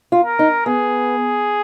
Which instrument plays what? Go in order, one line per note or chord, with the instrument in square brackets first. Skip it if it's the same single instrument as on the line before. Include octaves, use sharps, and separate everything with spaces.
[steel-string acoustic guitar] F4
[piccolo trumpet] A#4
[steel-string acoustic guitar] D#4
[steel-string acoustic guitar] B3 [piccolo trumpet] G#4